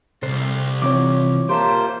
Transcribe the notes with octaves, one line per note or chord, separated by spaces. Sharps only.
C2 A4 C5
E3 F3 C4 C#5 D6
A#3 F4 G4 C5 E5 A5